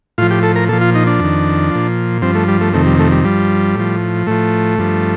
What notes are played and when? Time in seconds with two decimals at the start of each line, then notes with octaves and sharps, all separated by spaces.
0.18 A2 F3 F4
0.31 G4
0.43 A4
0.56 A#4
0.69 A#2 F3 A4
0.81 F4
0.95 D#4
1.07 D4
1.19 F2 D#3
1.71 A#2 F3
2.22 G2 F3 C4
2.35 A3
2.48 G3
2.61 A3
2.73 F2 C3 D#3 A3
2.86 G3
2.99 A3
3.12 G3
3.24 G2 F3 G3
3.76 A2 F3
4.27 A2 F3 A3
4.78 G2 F3